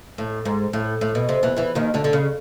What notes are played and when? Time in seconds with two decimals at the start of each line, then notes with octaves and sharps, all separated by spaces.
0.18 A2
0.45 G#2
0.73 A2
1.01 A2
1.15 B2
1.29 C3
1.43 E2 E3
1.56 E2 E3
1.75 D#2 D#3
1.94 D2 D3
2.04 D3
2.13 C#3